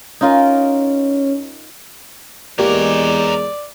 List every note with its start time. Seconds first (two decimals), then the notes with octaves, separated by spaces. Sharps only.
0.21 C#4 D#4 F4 A#4
2.59 E2 G#3 A#3 G4 A#4 C#5 D5